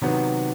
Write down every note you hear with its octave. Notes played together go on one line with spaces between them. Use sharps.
C3 D#3 F#3 B3